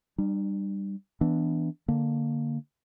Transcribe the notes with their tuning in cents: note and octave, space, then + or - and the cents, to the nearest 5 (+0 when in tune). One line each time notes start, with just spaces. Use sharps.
G3 +0 D4 +40
E3 -15 B3 +0 D4 +0
D3 +0 A#3 -5